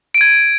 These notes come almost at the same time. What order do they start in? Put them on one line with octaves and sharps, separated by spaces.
D7 D#7 G#6